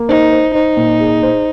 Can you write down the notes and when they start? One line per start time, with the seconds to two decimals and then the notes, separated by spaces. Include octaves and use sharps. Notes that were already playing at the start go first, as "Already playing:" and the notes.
Already playing: A#3
0.09 D#4 C5
0.32 C5
0.54 D#4 C5
0.77 A#2
1.00 G#4
1.23 C5